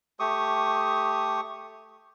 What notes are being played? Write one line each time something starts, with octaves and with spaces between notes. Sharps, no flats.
A3 G4 C#6 D#6